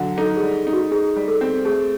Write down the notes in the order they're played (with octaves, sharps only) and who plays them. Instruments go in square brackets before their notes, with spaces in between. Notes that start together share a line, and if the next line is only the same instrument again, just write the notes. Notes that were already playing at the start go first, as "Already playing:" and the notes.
Already playing: [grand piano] D3 F#3
[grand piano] D#4 [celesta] A4
[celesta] G#4
[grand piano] G3
D#4
[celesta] F#4
[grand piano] D#4 [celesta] G#4
[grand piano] G3
[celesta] A4
[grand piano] C4
[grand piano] A3 [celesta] G#4